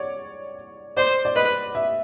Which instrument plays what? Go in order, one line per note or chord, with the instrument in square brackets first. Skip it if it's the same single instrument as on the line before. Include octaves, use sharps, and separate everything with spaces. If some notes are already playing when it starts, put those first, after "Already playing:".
Already playing: [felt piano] C#5 D5
[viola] C5 [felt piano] D5
[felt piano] D5
[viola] B4 [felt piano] D#5
[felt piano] E5